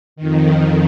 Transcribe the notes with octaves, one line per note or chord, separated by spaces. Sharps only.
F2 D#3